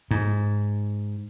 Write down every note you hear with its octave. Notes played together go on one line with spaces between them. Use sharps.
G#2